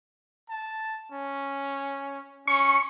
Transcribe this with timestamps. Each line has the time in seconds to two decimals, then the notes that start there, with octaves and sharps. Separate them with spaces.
0.49 A5
1.12 C#4
2.47 C#4 C#6